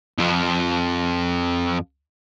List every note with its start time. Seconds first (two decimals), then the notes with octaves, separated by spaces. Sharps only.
0.18 F2 F3